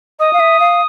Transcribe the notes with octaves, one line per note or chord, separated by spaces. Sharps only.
D#5 D#6
F5
E5
F5